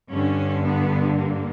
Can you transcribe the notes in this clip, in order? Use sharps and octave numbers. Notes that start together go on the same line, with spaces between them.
G2 D3 C#4
B3
A#3